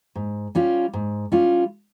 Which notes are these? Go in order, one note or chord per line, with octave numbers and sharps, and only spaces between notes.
G#2
G3 C#4 F4
G#2
G3 C#4 F4